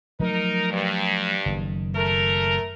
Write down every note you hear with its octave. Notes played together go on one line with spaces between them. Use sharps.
F3 F#3 A3 D#4 A#4
G2
F#1 D#3
A3 A#4